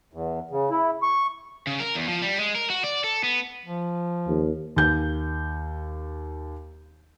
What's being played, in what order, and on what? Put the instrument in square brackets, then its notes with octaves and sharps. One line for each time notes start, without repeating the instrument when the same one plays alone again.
[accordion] E2
C#3
E4
C#6
[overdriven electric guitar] C#3
A#4
E2
F3
G3
G#3
A#4
F#4
D5
A4
B3
[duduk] F3
[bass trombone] D#2
[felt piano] D#2 G6